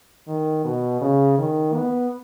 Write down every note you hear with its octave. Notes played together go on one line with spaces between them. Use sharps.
D#3
B2
C#3
D#3
B3